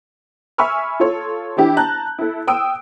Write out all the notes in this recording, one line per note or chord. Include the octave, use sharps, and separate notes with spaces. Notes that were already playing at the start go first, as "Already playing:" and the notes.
E5 G#5 B5 C#6 E6 F6
F4 A4 C#5
E3 D4 E4 G4
A5 A#5 F#6 G6
E4 A4
G5 D#6 E6 D7